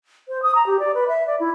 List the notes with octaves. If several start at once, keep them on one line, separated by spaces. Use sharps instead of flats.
C5
D#6
A#5
G4
D5
B4
E5
D5
E4